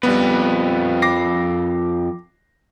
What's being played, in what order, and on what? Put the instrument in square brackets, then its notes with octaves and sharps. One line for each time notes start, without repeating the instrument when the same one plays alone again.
[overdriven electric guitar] F2 B4 [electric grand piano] G3 B3
[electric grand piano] D6 A#6 C7